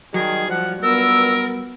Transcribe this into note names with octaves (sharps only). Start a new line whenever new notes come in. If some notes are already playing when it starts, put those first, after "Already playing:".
D#3 F#3 G3 G#4
F3 F#5
G2 A#2 B3 A#4 E6